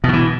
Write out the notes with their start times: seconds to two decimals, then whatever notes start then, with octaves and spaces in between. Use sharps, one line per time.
0.04 B2
0.08 D#3
0.13 E3